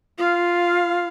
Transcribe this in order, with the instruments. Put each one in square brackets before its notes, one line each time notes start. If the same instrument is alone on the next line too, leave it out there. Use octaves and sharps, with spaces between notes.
[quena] F4 [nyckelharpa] F5